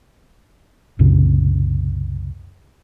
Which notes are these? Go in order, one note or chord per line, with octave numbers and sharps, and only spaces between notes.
C2 F#2 A#2 C#3